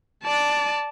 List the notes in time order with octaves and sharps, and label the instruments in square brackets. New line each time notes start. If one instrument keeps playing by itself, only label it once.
[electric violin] D5 A5